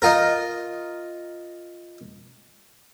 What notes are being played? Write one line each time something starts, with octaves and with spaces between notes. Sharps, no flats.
D#4 F4 A#4